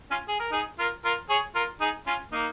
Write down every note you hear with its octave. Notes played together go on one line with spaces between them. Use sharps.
C#4 F4
G#4
A#4
D#4 G#4
F4 A#4
F4 A#4
G#4 C#5
F4 A#4
D#4 G#4
C#4 F4
A#3 D#4